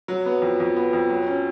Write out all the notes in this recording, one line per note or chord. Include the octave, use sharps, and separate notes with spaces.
F#3
B3
F2
F2
B3
F2
F#3
C#4